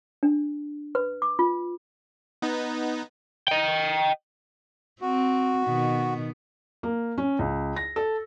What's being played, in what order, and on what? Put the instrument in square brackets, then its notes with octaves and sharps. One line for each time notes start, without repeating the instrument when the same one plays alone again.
[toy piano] D4
B4
D6
F4
[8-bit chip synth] B3 D#4
[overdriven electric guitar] D#5 G5
[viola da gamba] C4 [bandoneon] F#4
[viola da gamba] B2 D#3 B3
[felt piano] A#3
C#4
C#2
A#6
A4